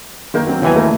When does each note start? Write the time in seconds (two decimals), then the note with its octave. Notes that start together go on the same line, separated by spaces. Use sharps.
0.34 D#3 A#3 G6
0.47 F#3 C4
0.62 D#2 E3 F#3 B3 G#5
0.75 A3 A#3